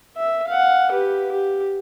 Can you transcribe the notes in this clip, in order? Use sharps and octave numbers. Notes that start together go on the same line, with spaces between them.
E5
F5 F#5
G4 B4
G4